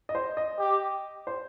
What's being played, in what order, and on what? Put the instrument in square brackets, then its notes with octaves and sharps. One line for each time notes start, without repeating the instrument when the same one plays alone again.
[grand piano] D#5
C5
D#5
[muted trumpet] G4
[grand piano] C5